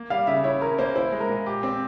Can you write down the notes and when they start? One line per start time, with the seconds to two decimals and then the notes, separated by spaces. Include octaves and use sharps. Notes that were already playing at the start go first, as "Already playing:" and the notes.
Already playing: A#3
0.10 G3 F5
0.27 C#3 E5
0.44 E4 C#5
0.61 C#4 A#4
0.78 A#3 C5
0.95 E4 C5
1.12 G#3
1.21 A#4
1.29 A#2
1.46 G4
1.63 C4 C5